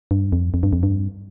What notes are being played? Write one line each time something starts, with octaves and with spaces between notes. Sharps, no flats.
G2
F2
F2
G2
F2
G2